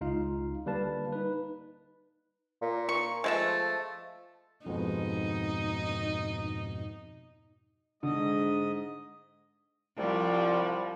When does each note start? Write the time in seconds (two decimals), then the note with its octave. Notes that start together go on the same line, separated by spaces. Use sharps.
0.01 C#2 D#4 F4 F5
0.66 D3 G3 A#3 B4 F5 A5
1.13 D#4 B4
2.62 A#2
2.89 C#6
3.24 F3 G#3 A3 E5
4.66 F2 G#2 B2 D#4
8.03 G#2 D3 D#5
9.98 C2 F3 G3